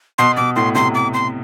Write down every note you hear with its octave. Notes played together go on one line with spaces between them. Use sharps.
B2 C6
B2 D6
A2 C6
C3 C6
D6
C6